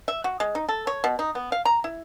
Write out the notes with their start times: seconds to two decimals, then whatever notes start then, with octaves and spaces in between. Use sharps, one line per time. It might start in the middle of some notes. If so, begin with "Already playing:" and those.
0.08 E5
0.24 F#4
0.40 G#3
0.55 D#4
0.69 A4
0.87 C#5
1.04 B2
1.19 D#4
1.35 B3
1.52 F5
1.65 A#5
1.84 E4